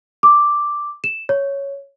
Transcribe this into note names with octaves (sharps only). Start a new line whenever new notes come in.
D6
E7
C#5